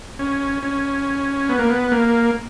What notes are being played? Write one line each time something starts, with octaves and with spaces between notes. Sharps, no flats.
C#4
C#4
B3
A#3
B3
A#3